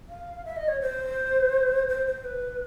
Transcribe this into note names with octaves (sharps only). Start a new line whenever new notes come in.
F5
E5
D#5
C#5
C5
C5
C5
B4